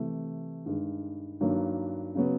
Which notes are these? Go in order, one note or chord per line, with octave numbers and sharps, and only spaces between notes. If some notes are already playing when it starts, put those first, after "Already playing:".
Already playing: C3 E3 A3
G2 D#3 G#3
G2 D#3 F#3 A#3 D4
C#3 F#3 B3